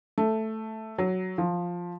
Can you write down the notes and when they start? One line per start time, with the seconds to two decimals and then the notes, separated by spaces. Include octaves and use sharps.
0.18 A3
0.99 F#3
1.38 F3